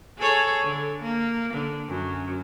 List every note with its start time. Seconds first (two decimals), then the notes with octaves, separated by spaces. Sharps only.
0.18 G#4 A4 C#5
0.64 D3
1.02 A#3
1.54 D3
1.88 F#2